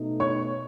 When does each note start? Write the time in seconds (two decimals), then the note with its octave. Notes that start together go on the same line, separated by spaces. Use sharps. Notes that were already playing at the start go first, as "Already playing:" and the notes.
Already playing: B2 A3 D#4
0.20 C#5 C#6